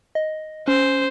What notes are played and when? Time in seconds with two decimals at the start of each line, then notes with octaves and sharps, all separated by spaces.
0.15 D#5
0.68 C#4 C5